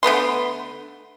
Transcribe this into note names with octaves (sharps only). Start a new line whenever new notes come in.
D3 A3 B3 C6